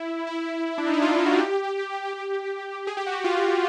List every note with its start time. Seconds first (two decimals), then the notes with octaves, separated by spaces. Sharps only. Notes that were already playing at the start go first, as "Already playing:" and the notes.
Already playing: E4
0.27 E4
0.78 D4
0.87 D#4
0.94 E4
1.02 F4
1.15 F4
1.26 F#4
1.38 G4
2.13 G4
2.87 G#4
2.97 G4
3.06 F#4
3.24 F4